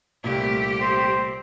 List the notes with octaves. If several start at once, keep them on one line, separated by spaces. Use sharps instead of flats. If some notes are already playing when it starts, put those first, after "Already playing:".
C2 A#2 A3 G4
C4